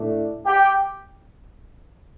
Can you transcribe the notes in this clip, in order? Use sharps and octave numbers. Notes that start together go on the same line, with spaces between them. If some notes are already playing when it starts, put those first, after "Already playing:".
Already playing: A2 A3 D4
G4 G5